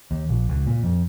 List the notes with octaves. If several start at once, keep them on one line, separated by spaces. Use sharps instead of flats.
D#2
A#1
C#2
A#2
F2